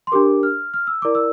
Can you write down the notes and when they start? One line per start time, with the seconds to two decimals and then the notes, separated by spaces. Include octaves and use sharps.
0.07 C6
0.12 D4 G4 A#4 D6
0.43 F6
0.74 F6
0.87 E6
1.02 E4 A#4 D5 D6
1.15 E6